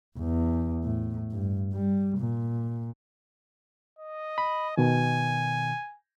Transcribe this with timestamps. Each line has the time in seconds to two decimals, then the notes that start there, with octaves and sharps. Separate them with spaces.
0.18 E2
0.84 A2
1.31 G2
1.73 G3
2.18 A#2
3.99 D#5
4.38 B5
4.77 B2 D#3 G#5